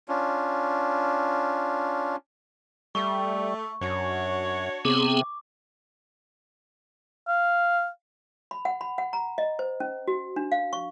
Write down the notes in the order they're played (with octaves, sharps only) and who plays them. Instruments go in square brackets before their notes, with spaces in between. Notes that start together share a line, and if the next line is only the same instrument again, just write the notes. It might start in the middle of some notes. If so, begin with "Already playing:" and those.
[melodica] C#4 D4 F4
[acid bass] G3 [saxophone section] A3 [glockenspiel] C#6
[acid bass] F#2 [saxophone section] D4 F#4 C#5
[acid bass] C3 [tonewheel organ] B3 C4 G#4 [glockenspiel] D6
[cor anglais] F5
[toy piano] B5
F#5
B5
F#5
A#5
D#5
C5
C#4
F#4
D4
F5
C#6